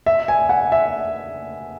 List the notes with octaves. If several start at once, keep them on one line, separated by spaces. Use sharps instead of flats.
E5
G#5
F#5
E5